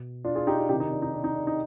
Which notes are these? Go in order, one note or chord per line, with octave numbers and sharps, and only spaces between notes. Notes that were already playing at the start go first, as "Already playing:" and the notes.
Already playing: B2
D4 F4
F4 G#4
D#4 G4
D4 F4
C3 D#3 D#4 G4
D#4
D4
D#4
D4
D#4
D4
D#4